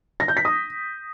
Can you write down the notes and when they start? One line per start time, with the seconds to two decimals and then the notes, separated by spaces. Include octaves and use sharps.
0.20 A#6
0.28 G6
0.37 B6
0.45 D#6